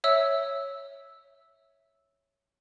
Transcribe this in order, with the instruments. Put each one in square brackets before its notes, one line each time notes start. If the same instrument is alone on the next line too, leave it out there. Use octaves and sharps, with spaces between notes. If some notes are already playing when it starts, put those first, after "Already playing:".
[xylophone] C#5 E5 E6